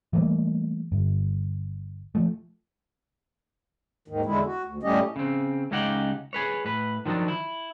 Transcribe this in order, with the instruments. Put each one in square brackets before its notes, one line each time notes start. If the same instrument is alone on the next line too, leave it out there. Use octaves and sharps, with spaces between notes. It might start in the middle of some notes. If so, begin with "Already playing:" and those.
[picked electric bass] E3 G3 A3 A#3
G1
F3 A3
[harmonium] D#2 G#2 D#3
E2 D3 G#3 E4
F#4
D2
A2 G3 A3 C#4 G4 D#5
[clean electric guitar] C#3 C4
C#2 C#3 C#4 D#4 G4 F#5
G#4 B4 C#5
A2 B4
D#3 F3 F#3 D4
E4